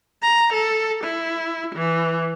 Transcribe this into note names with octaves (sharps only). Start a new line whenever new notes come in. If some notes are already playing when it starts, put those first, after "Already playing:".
A#5
A4
E4
E3